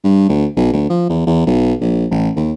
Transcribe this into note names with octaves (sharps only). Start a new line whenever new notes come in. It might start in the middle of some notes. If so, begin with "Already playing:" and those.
G2
D2
B1
D2
F3
E2
E2
B1
A#1
A1
D#2